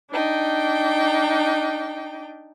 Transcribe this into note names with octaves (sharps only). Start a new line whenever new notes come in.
D4 D#4 G5